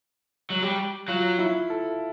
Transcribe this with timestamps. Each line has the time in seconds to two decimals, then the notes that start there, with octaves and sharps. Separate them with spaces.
0.50 F#3
0.62 G3
1.08 F#3 F4
1.39 E4
1.70 A4